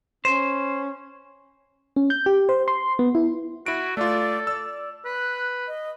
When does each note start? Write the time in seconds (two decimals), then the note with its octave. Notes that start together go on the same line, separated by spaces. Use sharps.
0.25 C#4 C5
1.96 C#4
2.10 G6
2.26 G4
2.49 C5
2.68 C6
2.99 B3
3.15 E4
3.66 E4 F#4 D7
3.97 A3 F4 A4 D5
4.47 D5 E6
5.05 B4 F#6
5.68 D#5